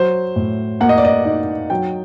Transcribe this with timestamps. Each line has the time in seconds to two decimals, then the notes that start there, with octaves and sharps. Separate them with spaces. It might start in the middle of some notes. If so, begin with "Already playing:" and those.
Already playing: F#3 C5
0.36 A2
0.80 A#3 F#5
0.89 D#5
0.98 D5
1.05 D#5
1.25 D#4
1.70 F#3 G5